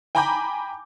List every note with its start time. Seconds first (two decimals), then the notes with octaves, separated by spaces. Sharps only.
0.15 G5 G#5 A#5 B5 D6 G6